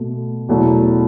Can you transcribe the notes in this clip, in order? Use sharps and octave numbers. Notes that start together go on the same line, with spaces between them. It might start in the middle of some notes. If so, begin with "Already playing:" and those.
Already playing: B2 A3
E2 B2 F#3 A3